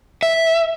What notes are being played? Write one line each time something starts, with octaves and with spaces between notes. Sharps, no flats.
E5